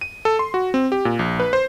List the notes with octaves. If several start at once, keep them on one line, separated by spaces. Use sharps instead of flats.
D#7
A4
C6
F#4
C4
G4
A#2
A#1
B4
C5